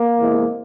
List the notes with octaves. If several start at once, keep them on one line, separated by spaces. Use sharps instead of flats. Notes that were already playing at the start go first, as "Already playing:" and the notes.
Already playing: A#3
E2 C3 E3 G#3